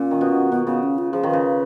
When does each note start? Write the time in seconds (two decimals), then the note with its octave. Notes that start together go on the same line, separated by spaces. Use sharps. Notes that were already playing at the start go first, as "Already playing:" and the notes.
Already playing: A#2 C#4
0.11 D#3
0.21 B2
0.52 B2 B3
0.66 C#3 B3
0.83 C#4
0.98 F4
1.12 F3 G#4
1.23 D#3 B4
1.33 C#3